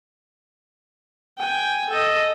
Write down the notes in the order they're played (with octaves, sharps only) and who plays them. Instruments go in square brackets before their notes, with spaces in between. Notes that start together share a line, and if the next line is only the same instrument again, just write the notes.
[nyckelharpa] G5 G#5
A4 D#5